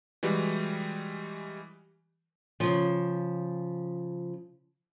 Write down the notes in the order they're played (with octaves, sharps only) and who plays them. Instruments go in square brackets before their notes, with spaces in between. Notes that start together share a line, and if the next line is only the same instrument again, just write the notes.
[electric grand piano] E3 G3 G#3 F#4 G4
[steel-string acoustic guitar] C#3 F3